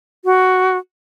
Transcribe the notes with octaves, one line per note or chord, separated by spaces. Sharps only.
F#4